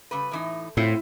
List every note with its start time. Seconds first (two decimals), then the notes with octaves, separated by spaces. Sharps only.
0.11 C#3 G3 B4
0.32 A2 E3 D#4
0.77 A2 C4 E4 F4 C5